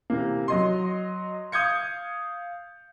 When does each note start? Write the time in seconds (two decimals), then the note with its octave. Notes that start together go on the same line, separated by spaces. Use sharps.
0.10 C3 E3 A#3
0.48 F#3 D#5 C6
1.52 F5 D#6 G6 G#6 C#7